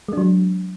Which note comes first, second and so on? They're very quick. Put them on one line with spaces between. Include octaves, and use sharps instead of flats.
G#3 D4 F#3